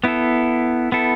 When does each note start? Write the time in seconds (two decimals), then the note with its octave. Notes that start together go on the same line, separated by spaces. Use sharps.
0.04 B3 E4 A4
0.92 B3 E4 A4